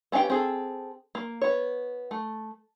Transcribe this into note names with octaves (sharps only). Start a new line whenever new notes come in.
B3 C#4 G4 F5 G5
C4 G#4 A4
A#3
B3 C#5
A3